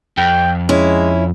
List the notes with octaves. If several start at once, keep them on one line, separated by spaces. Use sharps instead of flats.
F2 G5
G#3 C#4 E4